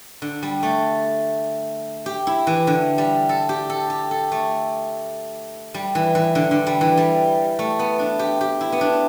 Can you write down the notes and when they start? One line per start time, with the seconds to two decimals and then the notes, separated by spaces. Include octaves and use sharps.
0.22 D3
0.43 G3
0.63 A3
2.06 G4
2.27 E4
2.47 E3
2.67 D3
2.98 G3
3.29 A4
3.49 G4
3.70 A4
3.90 G4
4.11 A4
4.32 A3
5.74 G3
5.95 E3
6.15 E3
6.35 D3
6.51 D3
6.67 G3
6.81 E3
6.97 G3
7.59 A3
7.79 B3
7.99 D4
8.19 G4
8.41 G4
8.61 E4
8.72 B3
8.81 D4